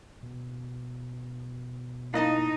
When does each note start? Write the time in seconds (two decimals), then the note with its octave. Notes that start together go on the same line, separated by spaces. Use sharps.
0.23 B2
2.14 A#3 D#4 E4 D#5 A5 A#5